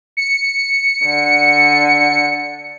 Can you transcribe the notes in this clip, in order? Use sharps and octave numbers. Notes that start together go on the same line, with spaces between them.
C#7
D3